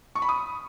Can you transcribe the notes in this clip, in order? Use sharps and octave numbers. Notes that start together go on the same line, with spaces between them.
C#6
B5
D#6